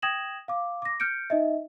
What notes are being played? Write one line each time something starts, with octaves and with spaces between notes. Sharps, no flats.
G5 D#6 G#6 A#6 E7 F#7
F5 D6
D6 A#6
F6 G6 C#7 D7
D#4 D#5 E5